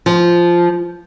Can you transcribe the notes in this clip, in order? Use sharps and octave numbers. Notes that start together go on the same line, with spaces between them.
F3